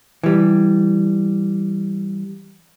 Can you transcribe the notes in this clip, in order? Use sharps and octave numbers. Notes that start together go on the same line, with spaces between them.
E3 G3